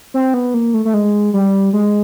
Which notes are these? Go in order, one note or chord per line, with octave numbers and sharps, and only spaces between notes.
C4
B3
A#3
A3
A3
G#3
G3
G#3